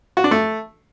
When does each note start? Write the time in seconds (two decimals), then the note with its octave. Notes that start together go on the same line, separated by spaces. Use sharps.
0.17 F#4
0.24 D4
0.31 A3